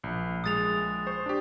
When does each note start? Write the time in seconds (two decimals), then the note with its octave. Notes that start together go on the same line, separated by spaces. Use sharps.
0.04 A#1
0.44 A#1 G#3 D#6 A6 F7
1.07 C5 C#6
1.26 D4 G4